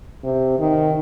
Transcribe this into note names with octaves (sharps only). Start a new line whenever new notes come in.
C3
D#3